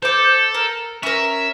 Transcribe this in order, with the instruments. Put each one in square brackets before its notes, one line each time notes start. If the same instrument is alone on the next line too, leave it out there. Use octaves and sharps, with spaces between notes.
[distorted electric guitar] A4 [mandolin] C5 D6
[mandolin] A#4
[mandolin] C#4 A#4 [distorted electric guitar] E5